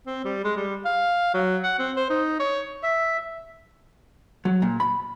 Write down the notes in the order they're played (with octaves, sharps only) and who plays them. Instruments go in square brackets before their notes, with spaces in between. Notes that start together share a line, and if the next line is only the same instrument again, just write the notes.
[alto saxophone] C4
G3
G#3
G3
F5
F#3
F#5
C4
C5
D#4
C#5
[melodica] E5
[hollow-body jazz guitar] F#3
A#2
B5